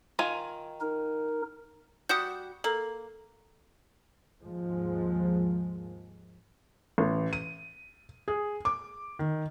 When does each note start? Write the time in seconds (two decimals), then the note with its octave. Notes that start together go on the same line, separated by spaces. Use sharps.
0.19 D#3 F4 G#5
0.81 D#4 A#4
2.09 G3 F#4 F#5 D#6 G6
2.64 A#3 A4
4.42 D#2 G#2 F3 G#3
6.98 A1
7.33 D#7
8.28 G#4
8.65 D6
9.19 D#3